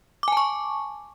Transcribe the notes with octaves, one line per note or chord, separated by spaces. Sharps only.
G#5 A5 C#6 D6